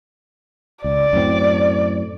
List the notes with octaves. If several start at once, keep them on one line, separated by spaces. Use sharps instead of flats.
C#2 D5
F#2 A2 C4